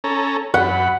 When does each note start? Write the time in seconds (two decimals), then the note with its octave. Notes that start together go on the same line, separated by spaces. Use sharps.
0.04 C#4 A4 A#5
0.54 F#2 F#5 B5